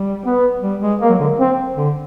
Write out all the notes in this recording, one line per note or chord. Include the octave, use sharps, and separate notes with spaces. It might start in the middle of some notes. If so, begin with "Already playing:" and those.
Already playing: G3
B3
G3
G#3
A#3
F#3
D3
C4
D3